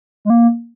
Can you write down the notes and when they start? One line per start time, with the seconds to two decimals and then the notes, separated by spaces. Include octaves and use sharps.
0.25 G#3
0.30 A#3